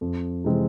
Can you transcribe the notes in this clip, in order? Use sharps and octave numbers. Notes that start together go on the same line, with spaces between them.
F2
C3 E3 G#3 C4